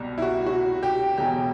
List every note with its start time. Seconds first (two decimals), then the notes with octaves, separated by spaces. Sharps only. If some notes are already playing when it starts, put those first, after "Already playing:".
Already playing: C2 B2 G3
0.18 E4
0.22 F#4
0.46 F#4
0.83 G4
1.17 E1 G4
1.20 E2 B2